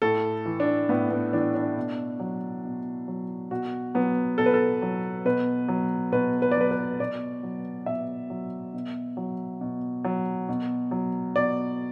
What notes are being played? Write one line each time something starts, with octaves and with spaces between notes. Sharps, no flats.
A2 A4
E3
D4
A2 B3
B3
E3 D4
D4
B2
F#3
B2
F#3
B2 F#4
F#3 B3
B2 A4
B4
A4
F#3
B2 B4
F#3
B2 B4
B4
F#3 D5
B4
B4
B2 D5
F#3
B2 E5
F#3
B2
F#3
B2
F#3
B2
F#3
B2 D5